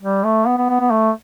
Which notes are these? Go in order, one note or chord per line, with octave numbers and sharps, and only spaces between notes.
G3
A3
B3
B3
B3
B3
A3